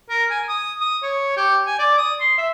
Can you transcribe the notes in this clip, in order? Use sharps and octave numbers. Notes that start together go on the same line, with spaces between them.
A#4
G#5
D#6
D#6
C#5
G4
G#5
D5
D#6
C6
E5